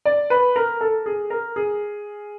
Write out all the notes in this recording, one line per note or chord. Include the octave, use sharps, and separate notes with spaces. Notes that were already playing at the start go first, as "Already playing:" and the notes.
D5
B4
A#4
A4
G#4
A#4
G#4